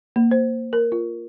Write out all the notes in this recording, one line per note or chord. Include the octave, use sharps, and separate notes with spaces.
A#3
C5
A#4
F4